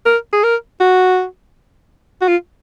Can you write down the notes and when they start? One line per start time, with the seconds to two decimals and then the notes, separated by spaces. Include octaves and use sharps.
0.06 A#4
0.33 G#4
0.44 A#4
0.80 F#4
2.22 F#4
2.28 F4